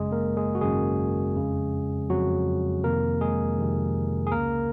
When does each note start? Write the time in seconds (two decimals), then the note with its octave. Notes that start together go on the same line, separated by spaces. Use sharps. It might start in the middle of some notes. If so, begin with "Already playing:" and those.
Already playing: G#1 F#2 C#3 G#3 G#4
0.12 A#3 A#4
0.37 G#3 G#4
0.55 F#4
0.61 G#1 F#2 C#3 G#3 G#4
1.36 F2 C#3
2.10 F2 C#3 F#3 F#4
2.84 F2 C3 D#3 A#3 A#4
3.21 G#3 G#4
3.58 F2 C3 D#3
4.27 G#4
4.32 C#2 C#3 A#3 A#4